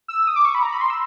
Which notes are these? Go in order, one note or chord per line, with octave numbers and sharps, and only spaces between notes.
E6
D#6
D6
C#6
B5
A#5
B5
C6
E6